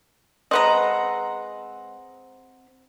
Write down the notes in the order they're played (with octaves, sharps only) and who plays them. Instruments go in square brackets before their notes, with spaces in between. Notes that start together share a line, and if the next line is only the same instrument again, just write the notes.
[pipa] G#3 B4 D#5 [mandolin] C4 F#5 A#5